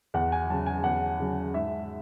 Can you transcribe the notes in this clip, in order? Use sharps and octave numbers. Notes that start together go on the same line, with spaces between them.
E2 F#5
G#5
C#3 F#3 A5
G#5
E2 F#5
C#3 F#3
G#2 E5